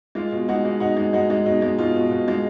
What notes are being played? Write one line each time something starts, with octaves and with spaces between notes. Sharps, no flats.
G#3 F4
B2
G#3 D#4 F#4
G#3
B2 D#4 F#4
G#3
G#3 D#4 F#4
G#3
B2 D#4
G#3
B2 F4
B2
B2
G#3